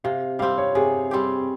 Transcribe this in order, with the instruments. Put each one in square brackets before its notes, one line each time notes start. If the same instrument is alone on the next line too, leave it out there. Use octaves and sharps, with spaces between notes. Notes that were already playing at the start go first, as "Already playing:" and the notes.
[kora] C3 [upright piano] F5
[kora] G3 C4 G4 [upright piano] F5
[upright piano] C#5
[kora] C3 [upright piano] G#4
[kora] G3 C4 G4